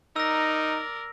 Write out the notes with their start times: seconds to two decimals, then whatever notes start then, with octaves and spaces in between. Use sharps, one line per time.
0.16 D#4 A#4 D5 E6 A#6